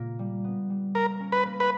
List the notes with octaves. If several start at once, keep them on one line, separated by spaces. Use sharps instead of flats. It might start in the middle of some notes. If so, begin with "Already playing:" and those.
Already playing: A#2 C#3 A#3
G3
B3
G3
A#3 A#4
C#4
B4
A#3
B4